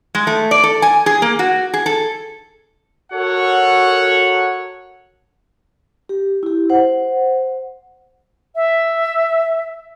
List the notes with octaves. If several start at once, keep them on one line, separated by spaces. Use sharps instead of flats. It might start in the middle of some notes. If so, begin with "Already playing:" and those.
G#3
A3
D5
A4
G#5
G#4
A#3
F#4
G#4
A4
F#4 A4 A#4 C#5 F#5
G4
E4 G4
C5 F#5
E5